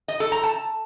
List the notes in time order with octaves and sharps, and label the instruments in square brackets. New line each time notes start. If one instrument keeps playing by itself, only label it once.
[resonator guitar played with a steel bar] D#5
A4
A#5
A5